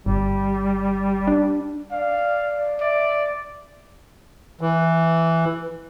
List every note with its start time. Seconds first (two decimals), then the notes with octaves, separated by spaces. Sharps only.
0.06 G1 G3
1.28 D4
1.92 D5 F5
2.81 D5 E5
4.61 E3